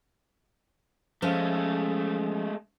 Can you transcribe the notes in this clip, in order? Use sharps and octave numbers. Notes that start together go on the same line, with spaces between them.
F3 G#3 A3 C#4 A5